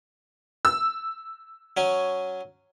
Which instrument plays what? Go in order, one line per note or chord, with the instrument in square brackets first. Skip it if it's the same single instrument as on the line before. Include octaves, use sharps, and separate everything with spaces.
[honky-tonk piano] E6
[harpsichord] F#3 C#4 G#5